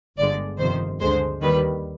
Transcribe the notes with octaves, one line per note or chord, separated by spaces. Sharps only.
G1 G2 D3 G#3 D5
G1 F2 C3 D#3 C5
D2 D3 G#3 C5
D#2 D#3 G3 B4